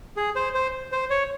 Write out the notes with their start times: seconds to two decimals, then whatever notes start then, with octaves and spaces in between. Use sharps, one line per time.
0.17 G#4
0.36 C5
0.54 C5
0.92 C5
1.10 C#5